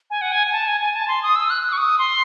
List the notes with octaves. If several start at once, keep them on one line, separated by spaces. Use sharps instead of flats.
G#5
F#5
G#5
G#5
A5
G#5
G#5
A5
C6
D#6
E6
F#6
E6
C#6
D#6
C6